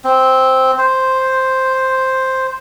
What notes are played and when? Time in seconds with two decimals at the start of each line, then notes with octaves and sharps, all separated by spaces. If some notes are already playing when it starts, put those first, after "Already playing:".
0.05 C4
0.78 C5